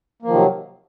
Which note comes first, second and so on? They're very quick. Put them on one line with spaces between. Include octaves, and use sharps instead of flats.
A#3 F3 D#3 C3 F#3